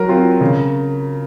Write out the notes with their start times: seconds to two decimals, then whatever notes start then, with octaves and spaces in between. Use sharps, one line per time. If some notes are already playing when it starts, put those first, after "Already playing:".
Already playing: F#3 A#4
0.09 C4 F4
0.41 C#3